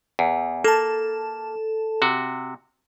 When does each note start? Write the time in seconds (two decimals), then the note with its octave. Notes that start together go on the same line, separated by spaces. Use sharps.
0.19 E2
0.64 A#3 A4 A5
2.02 C3 F#4